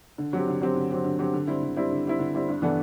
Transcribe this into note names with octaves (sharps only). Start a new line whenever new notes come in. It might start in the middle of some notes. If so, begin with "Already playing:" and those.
D3
F#3 C4 G4
D3
F#3 C4 G4
D3
F#3 C4 G4
D3
F#3 C4 G4
D3
G3 C4 E4
D3
G3 C4 E4
D3
G3 C4 E4
D3
G3 C4 E4
G2
E3 B3 D4 A4